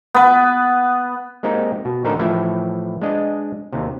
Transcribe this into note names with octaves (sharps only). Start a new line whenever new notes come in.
B3 B4
G#3 A#3 C4 D#4 G4
B2
A1 D3 D#4 A4 A#4 C5
A2 E3 F3 E4 E5
G#3 D4 D#5
D#2 C3